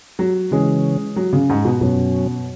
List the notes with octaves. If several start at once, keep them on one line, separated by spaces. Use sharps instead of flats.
F#3
C#3 E3 G#3 C#4
F#3
C#3
G#2
B2
F#2 B2 F#3 C#4